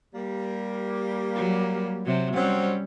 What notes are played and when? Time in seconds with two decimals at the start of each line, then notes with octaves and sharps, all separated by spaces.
0.14 G3 A#3
1.35 F#3
2.06 C3 F#3
2.34 F#3 G3 C4 C#4